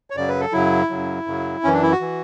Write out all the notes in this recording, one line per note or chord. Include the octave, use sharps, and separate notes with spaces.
C#5
F#2 C#3 F#3 D5
B4
A4
F#2 C#3 F#3 E4
F#2 C#3 F#3
F#2 C#3 F#3
F#2 E3 C#4
D4
E4
F#4
E3